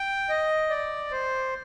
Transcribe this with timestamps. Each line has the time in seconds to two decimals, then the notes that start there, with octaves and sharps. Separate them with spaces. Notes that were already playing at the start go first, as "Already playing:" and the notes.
Already playing: G5
0.29 D#5
0.70 D5
1.11 C5